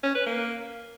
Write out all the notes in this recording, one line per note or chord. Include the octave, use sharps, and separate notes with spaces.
C#4
B4
A#3